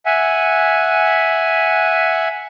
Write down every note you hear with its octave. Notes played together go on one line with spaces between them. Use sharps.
E5 F#5 G#5